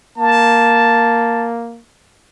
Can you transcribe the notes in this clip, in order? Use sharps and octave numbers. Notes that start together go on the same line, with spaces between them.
A#3 A5